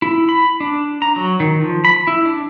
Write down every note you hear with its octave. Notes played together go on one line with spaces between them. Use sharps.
E4
B5
D4
A#5
F#3
D#3
F3
B5
E4
D4